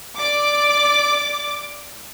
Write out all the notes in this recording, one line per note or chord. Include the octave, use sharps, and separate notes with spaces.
D5 D6